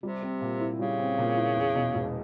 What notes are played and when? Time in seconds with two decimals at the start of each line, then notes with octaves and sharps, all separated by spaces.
0.03 C3 G3
0.22 C4
0.41 A#2
0.60 E4
0.79 C#3 G3
0.99 C4
1.18 A#2
1.37 E4
1.56 E2
1.75 B2
1.94 E1